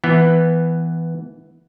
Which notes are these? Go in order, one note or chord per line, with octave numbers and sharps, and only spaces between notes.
E3 B3